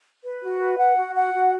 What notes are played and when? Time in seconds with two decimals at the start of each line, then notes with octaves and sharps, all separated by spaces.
0.24 B4
0.42 F#4
0.59 B4
0.78 F#5
0.96 F#4
1.15 F#5
1.33 F#4